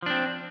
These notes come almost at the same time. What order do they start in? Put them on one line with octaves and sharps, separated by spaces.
F3 D4 C4